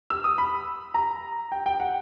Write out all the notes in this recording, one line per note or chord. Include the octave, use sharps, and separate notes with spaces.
E6
D#6
B5
A#5
G5
G5
F#5